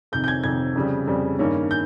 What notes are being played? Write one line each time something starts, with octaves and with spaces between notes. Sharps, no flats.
F2 C3 D#3 G6
G6
G#6
F2 C3 D#3 G#6
F2 C#3 G3
F2 C#3 G3
G2 D#3 A#3 C#4
G6